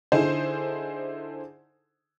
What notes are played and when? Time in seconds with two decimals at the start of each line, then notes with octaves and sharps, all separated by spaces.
0.12 D3 D#4 E4 G#4 C5